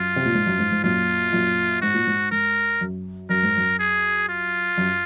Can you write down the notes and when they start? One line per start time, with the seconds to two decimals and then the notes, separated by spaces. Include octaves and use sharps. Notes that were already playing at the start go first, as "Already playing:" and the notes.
Already playing: F#2 F4
0.16 C3
0.26 A#2
0.34 G#2
0.47 F#2
0.59 G#2
0.72 G#2
0.83 F#2 A#2 F4
1.32 F#2 A#2
1.82 G#2 F#4
1.94 A#2
2.07 G#2
2.31 G#2 A#4
2.81 F#2
3.29 F#2 A#4
3.43 G#2
3.57 F#2
3.79 G#4
4.29 F4
4.77 F#2